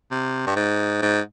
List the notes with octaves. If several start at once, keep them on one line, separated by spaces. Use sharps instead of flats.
C3
G2
G#2
G#2